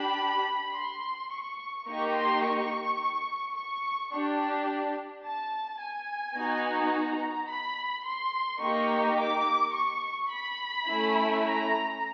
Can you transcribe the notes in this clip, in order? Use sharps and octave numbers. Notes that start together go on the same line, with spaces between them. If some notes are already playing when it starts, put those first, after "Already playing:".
Already playing: D4 G4 B5
C6
C#6
A#3 D#4 G4 C#6
C6
C#6
C#6
D4 G4
A5
G#5
B3 D#4 F#4
A#5
B5
C6
A#3 D#4 G4 C#6
D6
C#6
B5
A3 C#4 E4
A#5